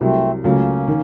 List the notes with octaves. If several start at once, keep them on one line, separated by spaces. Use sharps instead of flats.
C2 C3 F#3 A3 C4
C#2 C#3 F#3 A3 A#3 C#4
D#3